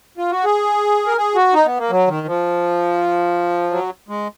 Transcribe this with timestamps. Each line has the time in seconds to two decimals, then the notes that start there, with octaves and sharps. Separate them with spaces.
0.18 F4
0.31 F#4
0.44 G#4
1.07 A#4
1.17 G#4
1.35 F#4
1.54 D#4
1.66 B3
1.78 A#3
1.90 F#3
2.08 D#3
2.27 F3
3.71 F#3
4.09 G#3